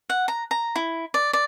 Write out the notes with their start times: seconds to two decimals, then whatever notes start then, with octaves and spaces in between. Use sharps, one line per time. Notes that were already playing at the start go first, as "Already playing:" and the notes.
0.10 F#5
0.28 A#5
0.51 A#5
0.76 E4
1.14 D5
1.33 D5